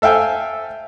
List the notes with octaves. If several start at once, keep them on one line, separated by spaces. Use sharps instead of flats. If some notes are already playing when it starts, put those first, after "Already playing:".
A4 E5 F5 G5 G#5